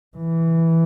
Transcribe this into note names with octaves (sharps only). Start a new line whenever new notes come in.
E3